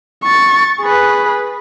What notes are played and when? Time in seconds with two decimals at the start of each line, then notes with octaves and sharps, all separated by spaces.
0.24 C#6 A6
0.81 G#4 B4